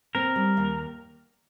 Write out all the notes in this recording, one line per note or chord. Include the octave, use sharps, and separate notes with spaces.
C4 A#4
G3
D#2